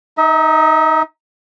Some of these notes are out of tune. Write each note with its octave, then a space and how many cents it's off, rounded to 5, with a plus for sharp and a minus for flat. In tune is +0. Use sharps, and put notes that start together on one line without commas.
D#4 +0 E5 -45